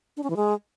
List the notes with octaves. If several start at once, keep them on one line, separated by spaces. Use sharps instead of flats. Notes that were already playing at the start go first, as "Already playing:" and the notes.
D4
C#4
E3
G#3